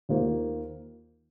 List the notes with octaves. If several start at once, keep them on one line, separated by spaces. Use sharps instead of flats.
D#2 D#3 A#3 F4 C5